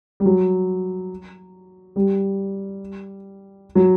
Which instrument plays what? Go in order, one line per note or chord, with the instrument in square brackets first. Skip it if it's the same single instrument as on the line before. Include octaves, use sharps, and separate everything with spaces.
[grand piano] G3
F#3
G3
F#3